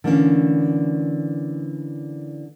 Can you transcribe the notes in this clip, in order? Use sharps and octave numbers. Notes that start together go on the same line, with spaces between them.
D3 E3 A3 A#3 C4 C#4